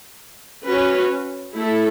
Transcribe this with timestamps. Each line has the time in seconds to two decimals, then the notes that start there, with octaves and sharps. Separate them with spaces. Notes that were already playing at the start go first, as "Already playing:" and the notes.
0.67 C#4 F#4 B4
1.58 A3 E4 A4